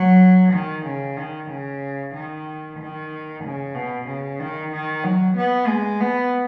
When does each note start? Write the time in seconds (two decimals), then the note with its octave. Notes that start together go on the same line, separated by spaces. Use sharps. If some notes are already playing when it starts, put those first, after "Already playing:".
Already playing: F#3
0.53 D#3
0.86 C#3
1.17 D#3
1.50 C#3
2.14 D#3
2.79 D#3
3.43 C#3
3.75 B2
4.07 C#3
4.39 D#3
4.72 D#3
5.04 F#3
5.36 B3
5.68 G#3
6.00 B3